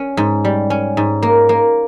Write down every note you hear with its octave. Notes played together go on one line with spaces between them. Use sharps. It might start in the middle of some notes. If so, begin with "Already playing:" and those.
Already playing: C#4
G#2
G3
C#4
G#2
A#3
A#3